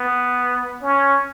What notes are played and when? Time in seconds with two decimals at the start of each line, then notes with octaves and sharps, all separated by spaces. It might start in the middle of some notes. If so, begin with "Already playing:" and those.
Already playing: B3
0.82 C#4